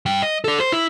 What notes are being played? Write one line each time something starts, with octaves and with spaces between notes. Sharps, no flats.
G2 G5
D#5
A4 D5
C5
E4